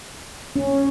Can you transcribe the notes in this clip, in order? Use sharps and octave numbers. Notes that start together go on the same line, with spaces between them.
C#4